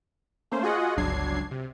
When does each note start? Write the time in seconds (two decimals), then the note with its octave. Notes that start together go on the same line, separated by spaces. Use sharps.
0.51 A3 A#3 C#4 C5
0.63 F4 F#4 G#4 D#5 F#5
0.97 G1 C#2 F#3 D4 G#6 C7
1.51 C3